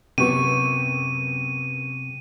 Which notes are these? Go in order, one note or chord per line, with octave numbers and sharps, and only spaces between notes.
F#2 C3 F#3 B3 G4 C#6 D6 D#7